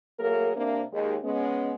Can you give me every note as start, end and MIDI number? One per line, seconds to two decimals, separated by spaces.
0.20 0.51 54
0.20 0.51 57
0.20 0.51 58
0.20 0.51 68
0.20 0.51 70
0.56 0.83 48
0.56 0.83 58
0.56 0.83 62
0.93 1.17 39
0.93 1.17 56
1.24 1.75 56
1.24 1.75 59
1.24 1.75 61